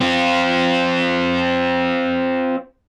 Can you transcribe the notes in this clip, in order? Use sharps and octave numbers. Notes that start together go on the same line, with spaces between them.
C4 F4